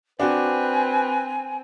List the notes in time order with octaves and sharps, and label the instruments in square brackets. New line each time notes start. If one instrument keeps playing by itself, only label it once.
[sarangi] C4 [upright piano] D4 F#4 [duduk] B4 [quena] G#5